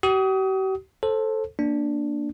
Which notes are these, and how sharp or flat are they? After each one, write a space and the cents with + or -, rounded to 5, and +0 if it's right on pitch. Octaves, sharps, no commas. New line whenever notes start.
G4 -45 D#6 +25
A4 +0 C5 +20
A#3 +0 D4 +0